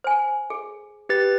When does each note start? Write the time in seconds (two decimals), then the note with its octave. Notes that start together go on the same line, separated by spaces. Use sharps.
0.04 C5 G#5
0.50 G#4
1.09 G4 B4 A6